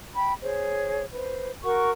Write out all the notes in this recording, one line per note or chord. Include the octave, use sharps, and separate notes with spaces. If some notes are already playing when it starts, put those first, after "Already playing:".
G5 B5
G#4 C5 C#5
B4 C5
F#4 A#4 F#5 C#6